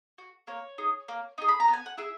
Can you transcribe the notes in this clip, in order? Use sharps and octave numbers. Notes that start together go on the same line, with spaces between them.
F#4
A#3 C#5
D#4 G#4
A#3
D#4 G#4
B5
A#5
B3
G#5
F#5
E4 G#4 E5